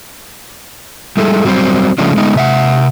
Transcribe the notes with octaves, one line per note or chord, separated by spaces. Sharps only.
G3 G#3 E4 A4
F#3 G3 C4 D4 C5
C#3 F3 G#3 A3 C#4 D4
G#3 A3 B3 D#4
C3 E5 F#5